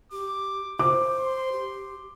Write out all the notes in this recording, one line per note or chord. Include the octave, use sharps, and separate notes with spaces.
G4 D6
C5 D6
C6
G4